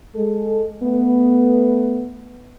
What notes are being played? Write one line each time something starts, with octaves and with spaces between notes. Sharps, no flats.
G#3 A4
A3 B3